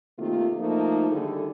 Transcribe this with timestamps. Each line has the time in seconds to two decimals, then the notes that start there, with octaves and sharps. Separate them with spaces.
0.18 C3 D#3 A3 A#3 F4
0.59 F3 A3 A#3 D#4
1.10 D3 D#3 G3 E4 G#4 A4